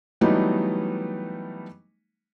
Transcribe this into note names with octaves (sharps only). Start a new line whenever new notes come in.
E3 F#3 G3 A3 B3 D#4